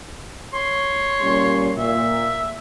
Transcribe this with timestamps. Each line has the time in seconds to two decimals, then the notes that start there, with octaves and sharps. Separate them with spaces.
0.54 C#5 C6
1.21 A#2 G3 C#4
1.77 A#2 E5